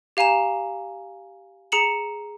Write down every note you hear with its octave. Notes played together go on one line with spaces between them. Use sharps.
G4 F5 G#5 A#5 E7
G#4 A#5 C#7 E7 F#7